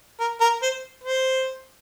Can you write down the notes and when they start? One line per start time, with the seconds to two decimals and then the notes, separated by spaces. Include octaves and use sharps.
0.20 A#4
0.41 A#4
0.62 C5
1.04 C5